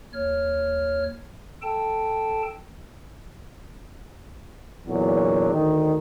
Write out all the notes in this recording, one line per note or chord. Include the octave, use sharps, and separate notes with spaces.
D#2 C#5 F6
A4 G5 A5
E2 A#2 D3 F#3
D2 D#3